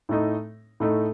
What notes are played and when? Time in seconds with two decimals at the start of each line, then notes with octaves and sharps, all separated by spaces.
0.09 A2 A3 D#4
0.80 A2 A3 D#4